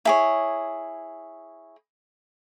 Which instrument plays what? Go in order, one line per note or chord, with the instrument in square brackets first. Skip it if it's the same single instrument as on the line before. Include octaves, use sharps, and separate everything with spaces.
[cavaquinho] E4 G#4 C#5